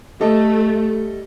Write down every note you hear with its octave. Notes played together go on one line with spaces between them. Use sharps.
G3 A3 A4 D#5